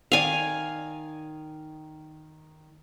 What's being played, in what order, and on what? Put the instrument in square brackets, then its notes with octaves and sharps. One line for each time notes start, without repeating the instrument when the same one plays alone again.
[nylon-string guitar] D#3 D5 [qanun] F5 G#5